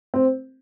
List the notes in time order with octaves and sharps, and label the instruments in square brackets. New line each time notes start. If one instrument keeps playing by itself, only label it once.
[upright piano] C4